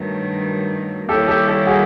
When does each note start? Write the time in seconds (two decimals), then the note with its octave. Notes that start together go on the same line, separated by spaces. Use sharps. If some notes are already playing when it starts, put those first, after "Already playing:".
Already playing: G2 D#3 F#3 A3
1.09 D#3 G3 A#3 C#4 E4 G4 A4
1.28 G4 A4
1.47 G4 A4
1.67 F#4 G#4